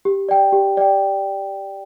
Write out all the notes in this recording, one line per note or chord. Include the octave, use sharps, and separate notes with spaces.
G4
D5 G5
G4
D5 G5